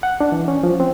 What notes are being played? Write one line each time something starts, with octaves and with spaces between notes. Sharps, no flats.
F#5
D4
E3
C#4
F3
C4